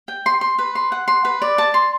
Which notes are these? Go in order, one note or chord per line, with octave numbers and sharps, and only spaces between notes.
G5
C6
C6
B4
C6
F#5
C6
B4
D5
A5
C6